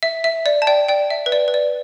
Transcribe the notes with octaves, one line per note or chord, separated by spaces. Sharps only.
E5
E5
D5
A5
D5 G5
D5 G5
E5
B4
D5
B4
D5